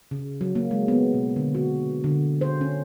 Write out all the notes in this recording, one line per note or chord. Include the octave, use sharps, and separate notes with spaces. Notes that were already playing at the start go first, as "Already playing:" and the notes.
C#3
F#3
A#3
G#3
B3
B2
D3
F#4
D3
C5
C#4